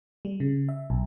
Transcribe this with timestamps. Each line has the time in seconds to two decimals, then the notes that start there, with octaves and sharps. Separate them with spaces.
0.25 G3
0.40 C#3
0.69 E5
0.90 B1